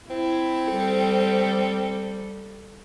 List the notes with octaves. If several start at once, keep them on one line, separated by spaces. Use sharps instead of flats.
C4 E4
G3 A4